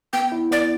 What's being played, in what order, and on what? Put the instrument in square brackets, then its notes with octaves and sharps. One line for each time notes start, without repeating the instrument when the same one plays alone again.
[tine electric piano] B3 [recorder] G5
[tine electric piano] E4
[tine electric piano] B3 [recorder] D5